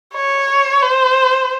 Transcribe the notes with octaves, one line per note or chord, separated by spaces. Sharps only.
C#5
C5